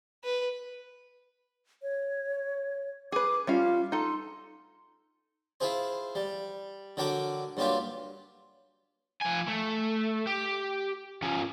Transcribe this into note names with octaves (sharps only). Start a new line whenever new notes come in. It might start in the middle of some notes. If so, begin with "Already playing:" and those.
B4
C#5
G#4 B4 D6
G3 C#4 F4 F5
D#4 A4 C6
E4 F4 G#4 C5
G3
D3 F#3 A#4 G5 D6
G2 F#3 A#3 F4 G4
F3 G#5
A3
G4
F3 C#4